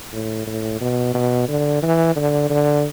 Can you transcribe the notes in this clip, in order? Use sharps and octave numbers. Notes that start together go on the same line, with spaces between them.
A2
A2
B2
B2
D3
E3
D3
D3